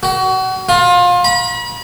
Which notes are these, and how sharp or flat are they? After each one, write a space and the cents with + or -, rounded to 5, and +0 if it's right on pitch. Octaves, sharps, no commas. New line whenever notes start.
F#4 +30
F4 +25
B5 -40